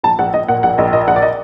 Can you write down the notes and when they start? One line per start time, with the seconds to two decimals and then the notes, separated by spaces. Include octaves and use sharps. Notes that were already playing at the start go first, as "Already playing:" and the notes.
0.03 A#1 A5
0.19 A#1 F#5
0.33 A#1 D#5
0.48 A#2 F#5
0.63 A#1 F#5
0.78 A#1 D#5
0.93 A#2 D#5
1.07 A#1 F#5
1.16 D5
1.22 D#5